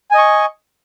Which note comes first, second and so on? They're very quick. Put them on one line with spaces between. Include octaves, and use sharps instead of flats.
G#5 D#5 C#6